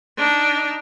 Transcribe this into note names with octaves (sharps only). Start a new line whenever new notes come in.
D4 D#4